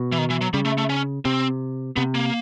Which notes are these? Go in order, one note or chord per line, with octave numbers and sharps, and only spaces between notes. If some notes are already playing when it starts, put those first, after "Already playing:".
Already playing: B2
E3
D#3
E3
F#3
C#3 G3
A3
A3
C#4
C3 C4
C3 B3
A#3